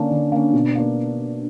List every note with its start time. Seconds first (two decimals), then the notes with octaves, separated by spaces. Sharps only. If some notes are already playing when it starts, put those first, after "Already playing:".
Already playing: D3 A#3 C#4 D4
0.11 D3
0.32 A#3 C#4
0.53 B2
0.75 A#3 D4 A#4 D5